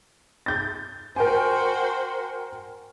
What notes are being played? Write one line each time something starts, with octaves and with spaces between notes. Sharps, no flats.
G6 A6
F#4 A#4 C5 G5 G#5